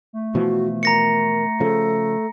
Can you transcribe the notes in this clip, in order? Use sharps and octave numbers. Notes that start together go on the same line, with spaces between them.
A3
B2 E3 F3 F#4
A#4 A#5 A#6 C#7
C#3 F3 A4